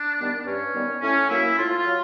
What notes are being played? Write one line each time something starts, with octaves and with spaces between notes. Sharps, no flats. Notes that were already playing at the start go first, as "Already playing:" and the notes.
Already playing: D4
D#3 G3 B3
G2 C#4
D#3 G3 B3
A2 C#4
F#3 A#3 E4
A2 F4
F4
F#3